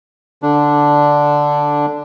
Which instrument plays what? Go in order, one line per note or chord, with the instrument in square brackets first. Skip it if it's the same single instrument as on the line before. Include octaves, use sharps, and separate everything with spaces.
[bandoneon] D3 D4